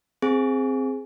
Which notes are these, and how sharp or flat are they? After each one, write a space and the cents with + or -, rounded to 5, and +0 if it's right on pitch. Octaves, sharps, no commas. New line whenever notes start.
C4 +0 G#4 +0